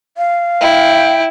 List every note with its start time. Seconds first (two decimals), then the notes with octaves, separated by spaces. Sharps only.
0.17 F5
0.61 E4 G5